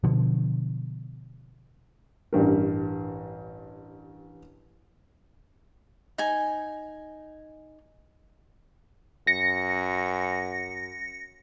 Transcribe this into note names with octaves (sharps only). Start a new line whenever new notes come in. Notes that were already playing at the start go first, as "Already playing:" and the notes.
B2 D3 F3
A1 G2 A#4
D#4 G#5
F#2 A#6 C#7